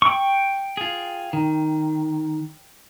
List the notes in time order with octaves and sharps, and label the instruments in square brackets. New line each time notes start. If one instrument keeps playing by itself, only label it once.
[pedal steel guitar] G5 C#6
[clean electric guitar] F4 G#4
D#3